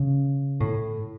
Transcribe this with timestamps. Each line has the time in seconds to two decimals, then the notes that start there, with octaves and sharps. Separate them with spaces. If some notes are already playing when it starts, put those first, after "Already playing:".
Already playing: C#3
0.60 A2